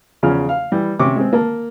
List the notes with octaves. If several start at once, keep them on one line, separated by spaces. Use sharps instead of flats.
E2 C#3 F3 C#4 F6
F5
E3 G3
C3 C#4 C#6 D6
G#3 C4
A#3 A5